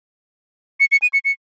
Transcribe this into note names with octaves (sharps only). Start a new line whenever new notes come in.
C#7
C#7
D#7
C#7
C#7